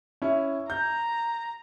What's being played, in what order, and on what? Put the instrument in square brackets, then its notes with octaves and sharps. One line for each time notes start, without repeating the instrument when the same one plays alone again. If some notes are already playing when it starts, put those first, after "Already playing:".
[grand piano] C#4 E4
[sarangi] A#5 [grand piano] G6